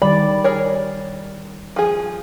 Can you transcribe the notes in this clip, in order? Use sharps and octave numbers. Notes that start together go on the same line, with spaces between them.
D#3 G3 D5 B5
G#4 A#4 C#5
F3 G#4